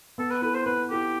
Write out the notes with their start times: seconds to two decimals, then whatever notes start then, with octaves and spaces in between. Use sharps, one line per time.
0.18 B3 A4
0.31 B4
0.42 E4 A4 B4
0.54 C5
0.66 B3 B4
0.90 E4 G4 A4